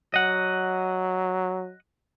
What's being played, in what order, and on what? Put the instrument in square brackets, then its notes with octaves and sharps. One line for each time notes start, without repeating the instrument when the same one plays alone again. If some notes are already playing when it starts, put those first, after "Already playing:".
[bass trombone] F#3 [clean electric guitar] D#5 F#5